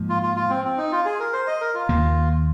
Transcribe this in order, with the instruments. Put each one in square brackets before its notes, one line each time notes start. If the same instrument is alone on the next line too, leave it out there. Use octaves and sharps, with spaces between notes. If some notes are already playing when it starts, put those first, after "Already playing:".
Already playing: [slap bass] G#2 F3 A#3
[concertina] F4
F4
F4
C4
C4
D#4
F4
G#4
A#4
C5
D#5
A#4
F4
[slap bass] D#2 D#3 A#3